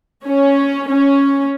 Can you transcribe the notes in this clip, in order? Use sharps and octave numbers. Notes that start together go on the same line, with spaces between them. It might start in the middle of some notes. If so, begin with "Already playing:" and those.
C#4
C#4